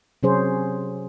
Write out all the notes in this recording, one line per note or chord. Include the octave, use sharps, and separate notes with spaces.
C3 F#3 C#4 G#4 C5